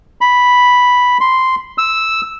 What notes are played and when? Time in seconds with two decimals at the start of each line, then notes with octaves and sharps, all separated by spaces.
0.21 B5
1.21 C6
1.78 E6